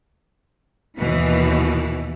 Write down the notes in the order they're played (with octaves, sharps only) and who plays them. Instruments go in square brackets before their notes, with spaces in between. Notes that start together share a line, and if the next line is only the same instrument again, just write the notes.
[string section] D#2 B2 E3